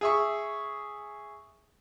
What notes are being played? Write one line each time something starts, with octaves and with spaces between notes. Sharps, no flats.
G#4 E5 C#6